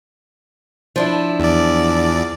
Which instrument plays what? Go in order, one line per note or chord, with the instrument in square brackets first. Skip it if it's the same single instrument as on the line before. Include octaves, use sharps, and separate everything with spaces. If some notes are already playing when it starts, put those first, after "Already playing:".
[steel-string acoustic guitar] F3 D4 E4
[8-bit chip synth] E2 D5